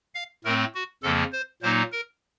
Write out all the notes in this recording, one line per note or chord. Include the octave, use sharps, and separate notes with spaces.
F5
A2 A3 C4 A#4
F#4
F2 C#3 F3 A#3 A4
C5
A#2 F#3 A#3 D#4 C5
A#4